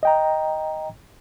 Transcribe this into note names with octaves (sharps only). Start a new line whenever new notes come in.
D#5 G5 A#5